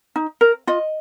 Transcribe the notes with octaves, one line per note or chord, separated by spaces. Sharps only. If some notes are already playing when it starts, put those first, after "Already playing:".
D#4
A#4
F4 D#5